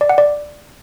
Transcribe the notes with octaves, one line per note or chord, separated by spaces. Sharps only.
D5
F#5
D5